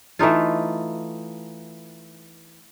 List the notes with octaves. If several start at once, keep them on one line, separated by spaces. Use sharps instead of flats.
E3 A3 D#4 F4